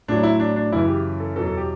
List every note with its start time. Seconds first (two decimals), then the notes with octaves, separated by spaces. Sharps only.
0.08 A2 F#3 D4
0.23 E4
0.40 D4
0.56 D4
0.72 F#2 C#3 E3 E4
0.87 G4
1.20 A4
1.36 E2 B2 F#3 A4
1.46 A4
1.57 G4